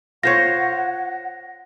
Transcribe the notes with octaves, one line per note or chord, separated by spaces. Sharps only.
F4 C5 C#5 F#5 A#6